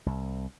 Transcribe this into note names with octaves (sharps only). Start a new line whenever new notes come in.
C2